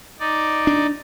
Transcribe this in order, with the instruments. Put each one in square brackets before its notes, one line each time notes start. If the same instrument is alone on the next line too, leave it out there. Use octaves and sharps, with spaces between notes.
[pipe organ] D#4 D5
[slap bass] D4